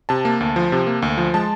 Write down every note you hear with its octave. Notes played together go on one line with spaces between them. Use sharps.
C3 A5
A#3
D2
F3
C3
A#3
D2
F3
G#3 A5